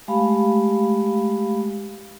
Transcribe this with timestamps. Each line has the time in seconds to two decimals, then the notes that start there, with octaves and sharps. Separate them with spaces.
0.08 G#3 A3 G4 F5 B5